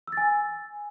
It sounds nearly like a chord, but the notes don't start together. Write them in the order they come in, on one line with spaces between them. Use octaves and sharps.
E6 A6 G#5